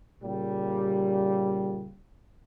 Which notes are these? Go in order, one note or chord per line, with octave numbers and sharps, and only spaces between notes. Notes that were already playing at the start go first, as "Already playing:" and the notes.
A#2 C#3 G3